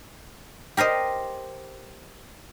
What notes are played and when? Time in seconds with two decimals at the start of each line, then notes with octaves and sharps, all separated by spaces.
0.77 G4 A#4 C5 D#5